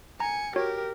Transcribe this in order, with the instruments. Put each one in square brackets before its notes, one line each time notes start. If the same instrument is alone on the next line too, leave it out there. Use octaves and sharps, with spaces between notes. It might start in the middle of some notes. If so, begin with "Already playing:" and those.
[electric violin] G#5 C#7 [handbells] A#5
[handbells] F#4 C#5 [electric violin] G4 A#4